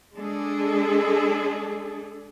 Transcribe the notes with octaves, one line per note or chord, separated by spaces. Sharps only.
G#3 D4 G#4 A4